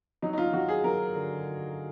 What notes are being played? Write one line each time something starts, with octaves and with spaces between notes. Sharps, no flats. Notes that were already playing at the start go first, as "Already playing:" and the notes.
F#3 D#4
D#4
F4
F#3 F#4
G#4
F#3 A#4
D3